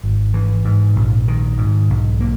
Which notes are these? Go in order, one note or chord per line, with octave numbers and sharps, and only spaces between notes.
G#1
E3
G#2
A#1
D#3
G#2
B1
A#3